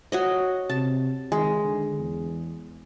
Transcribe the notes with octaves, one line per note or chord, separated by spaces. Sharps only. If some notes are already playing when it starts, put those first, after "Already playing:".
F#4 C#5 D#5
C3 A5
D#3 G#3
D3
E2